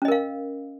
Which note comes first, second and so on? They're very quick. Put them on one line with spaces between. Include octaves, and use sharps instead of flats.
C#4 D#5 A#4 F5